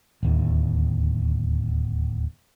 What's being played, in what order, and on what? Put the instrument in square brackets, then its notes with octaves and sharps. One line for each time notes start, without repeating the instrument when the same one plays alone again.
[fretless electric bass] D1 D#2